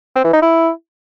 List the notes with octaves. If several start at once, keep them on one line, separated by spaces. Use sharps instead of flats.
C4
E3
D#4
E4